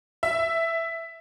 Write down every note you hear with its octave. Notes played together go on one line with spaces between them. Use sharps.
E5